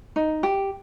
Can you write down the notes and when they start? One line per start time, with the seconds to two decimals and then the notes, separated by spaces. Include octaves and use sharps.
0.16 D#4
0.43 G4